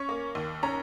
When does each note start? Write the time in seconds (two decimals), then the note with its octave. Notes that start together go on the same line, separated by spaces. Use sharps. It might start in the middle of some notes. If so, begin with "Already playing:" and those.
Already playing: C#4 C#6
0.09 A#3
0.35 D#2
0.63 C#4 A#5